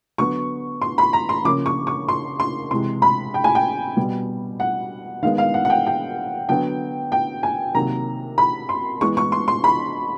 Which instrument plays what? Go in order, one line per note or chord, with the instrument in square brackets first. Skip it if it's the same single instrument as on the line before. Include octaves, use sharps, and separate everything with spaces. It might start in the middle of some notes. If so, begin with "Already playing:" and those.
[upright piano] D3 F#3 B3 C#6
C6
B5
A#5
C6
C#3 F3 A#3 C#4 D6
C#6
C#6
C6
C6
C3 E3 G#3 C6
B5
G5
G#5
G5
B2 G3 B3
F#5
D#3 G#3 B3 F5
F5
F#5
F#5
G5
G5
D3 F#3 B3 G5
G5
G#5
C3 D#3 F#3 A#3 A#5
B5
C6
E3 G#3 B3 C#6
C#6
C6
C6
B5